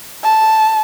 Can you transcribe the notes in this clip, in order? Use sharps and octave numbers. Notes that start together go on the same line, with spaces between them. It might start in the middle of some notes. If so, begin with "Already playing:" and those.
A5